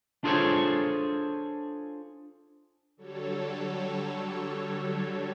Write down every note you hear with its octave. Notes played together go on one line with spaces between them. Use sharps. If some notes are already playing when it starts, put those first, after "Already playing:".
D4 F4 G#4 A4 C5 C#5
D3 F#3 G3 A4 C#5